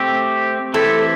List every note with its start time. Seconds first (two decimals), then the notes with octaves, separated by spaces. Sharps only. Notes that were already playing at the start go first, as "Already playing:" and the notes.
Already playing: A3 C4 G4
0.74 E3 A3 C4 E4 G4 A4